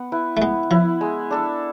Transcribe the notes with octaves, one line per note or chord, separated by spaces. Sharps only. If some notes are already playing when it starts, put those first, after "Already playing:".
Already playing: B3
E4 B4
A3
G#3 B3
F3 E4 B4
G#3
D4 A4